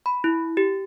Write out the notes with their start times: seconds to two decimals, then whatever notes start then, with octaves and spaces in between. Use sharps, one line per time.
0.06 B5
0.24 E4
0.57 G4